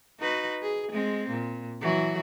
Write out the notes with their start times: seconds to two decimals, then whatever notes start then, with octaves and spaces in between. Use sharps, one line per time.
0.20 D#4 F#4 B4
0.62 G#4
0.91 G#3 C4
1.29 A#2
1.81 E3 F#3 F#4